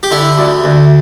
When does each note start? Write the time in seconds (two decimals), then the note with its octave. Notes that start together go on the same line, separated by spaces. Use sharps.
0.03 G4
0.11 D3 E4
0.38 D2
0.64 D2